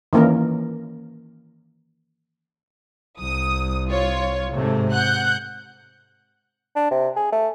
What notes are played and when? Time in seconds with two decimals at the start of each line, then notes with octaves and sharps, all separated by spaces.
0.13 D#3 E3 A#3 C#4 A#4
3.19 C2 D#6
3.89 F4 C#5
4.53 G#2 C3 A3
4.91 F#5 F#6 G6
6.76 D4
6.91 C3
7.16 G#4
7.32 A3